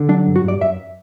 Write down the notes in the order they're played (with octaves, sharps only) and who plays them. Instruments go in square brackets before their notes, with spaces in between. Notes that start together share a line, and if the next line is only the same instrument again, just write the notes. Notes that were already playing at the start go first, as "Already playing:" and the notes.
Already playing: [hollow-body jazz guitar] D3
F#3 D4
G2
F#4
G2 D5
F#2 E5